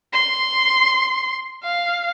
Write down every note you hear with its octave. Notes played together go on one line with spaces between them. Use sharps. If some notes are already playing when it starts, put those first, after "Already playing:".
C6
F5